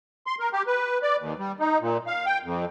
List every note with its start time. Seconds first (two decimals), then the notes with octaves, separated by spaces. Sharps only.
0.27 C6
0.40 A#4
0.53 G4
0.67 B4
1.03 D5
1.20 D#2
1.39 G3
1.60 D#4
1.81 A#2
2.07 F5
2.26 G5
2.44 F2